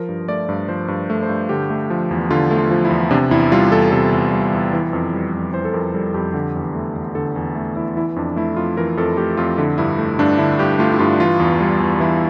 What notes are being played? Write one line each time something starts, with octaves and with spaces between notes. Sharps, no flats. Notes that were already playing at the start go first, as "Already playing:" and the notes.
Already playing: F3 A#4
G2
A3 D5
G2
F3 C5
G2
A3
C5
G2
D3 G4
A3
F3
E2
D3 F4
A3
F4
F3
E4
E2
C3 D4
E2 E4
G3 F4
E2 A4
C3 A4
E2
G3
E2
E3
F2
G3
F2
E3 C5
A4
F2 A#4
G3 A4
F2 G4
D3
E2
A3
E2
D3 A4
E2
A3
E2 E4
E3 E4
F2 D4
A3 E4
F2 F4
E3 A#4
F2 A4
A3 G4
F2 F4
D3 E4
G2 E4
A3
G2 D4
D3 E4
G2 G4
A3 F4
E4
G2 F4
E3 F4
E2
G3
E2
E3 E4